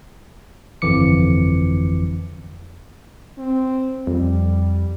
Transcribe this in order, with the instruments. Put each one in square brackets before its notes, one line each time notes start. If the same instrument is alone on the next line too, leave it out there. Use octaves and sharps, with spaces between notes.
[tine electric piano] G1 F2 E3 D6 C#7
[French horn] C4
[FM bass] F2 [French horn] G3